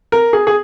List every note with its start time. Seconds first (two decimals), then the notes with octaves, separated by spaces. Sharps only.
0.12 A#4
0.33 G#4
0.47 G#4